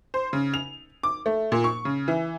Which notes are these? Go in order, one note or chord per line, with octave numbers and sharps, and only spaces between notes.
C5
C#3
F7
D6
A3
A#2
C#6
C#3
E3